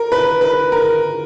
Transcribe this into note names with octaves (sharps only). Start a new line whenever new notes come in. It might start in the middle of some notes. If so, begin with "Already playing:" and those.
Already playing: A#4
B4
B4
A#4